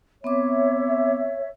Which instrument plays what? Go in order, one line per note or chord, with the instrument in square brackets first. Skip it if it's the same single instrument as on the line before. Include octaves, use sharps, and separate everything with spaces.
[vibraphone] B3 C4 D6 [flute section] C#5 E5